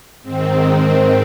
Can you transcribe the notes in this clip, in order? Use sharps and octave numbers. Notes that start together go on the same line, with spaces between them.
G#2 D#3 C4
C4